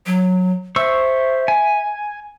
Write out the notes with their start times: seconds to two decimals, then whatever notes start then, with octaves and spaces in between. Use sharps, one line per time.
0.06 F#3
0.76 C5 E5 C#6 E6
1.48 G#5